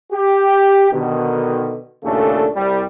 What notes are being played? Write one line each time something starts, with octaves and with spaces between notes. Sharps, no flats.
G4
B2 D3 D#3
D#2 A#2 C#3 A3 D4 A4
C2 G3